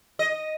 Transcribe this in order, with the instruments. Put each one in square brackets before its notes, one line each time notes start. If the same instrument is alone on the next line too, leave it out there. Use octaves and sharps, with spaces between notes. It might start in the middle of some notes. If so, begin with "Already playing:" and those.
[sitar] D#5